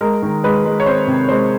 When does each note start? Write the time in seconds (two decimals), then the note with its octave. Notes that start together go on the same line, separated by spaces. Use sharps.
0.01 G#3 A#4
0.23 D#3
0.44 G#3 B4
0.65 G#3
0.80 C#5
0.86 C4 C5
1.07 C3
1.29 G#3 C5